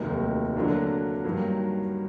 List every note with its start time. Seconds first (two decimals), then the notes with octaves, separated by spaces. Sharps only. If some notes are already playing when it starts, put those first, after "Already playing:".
Already playing: F1 D#2 D#3 F#3 A3
0.56 D3 F#3 A#3 D4
1.24 G2 D#3 F#3 A#3